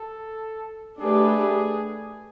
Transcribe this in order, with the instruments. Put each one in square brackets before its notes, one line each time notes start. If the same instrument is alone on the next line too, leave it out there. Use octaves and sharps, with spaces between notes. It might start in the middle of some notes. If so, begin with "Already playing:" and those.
Already playing: [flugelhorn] A4
[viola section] A3 D4 G4 B4 [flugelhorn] G#4